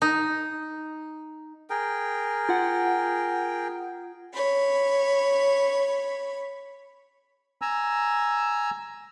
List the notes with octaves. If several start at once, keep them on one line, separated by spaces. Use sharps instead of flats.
D#4
G#4 A#4 G5
F4 F#5
C#5 B5
G#5 A#5 E6